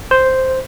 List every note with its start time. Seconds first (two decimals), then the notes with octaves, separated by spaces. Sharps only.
0.11 C5